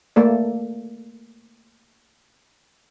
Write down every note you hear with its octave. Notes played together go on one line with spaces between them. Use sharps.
A3 A#3 A4 D5